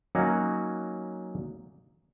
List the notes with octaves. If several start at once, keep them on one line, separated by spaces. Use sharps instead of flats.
F#3 A#3 C#4 D#4 F#4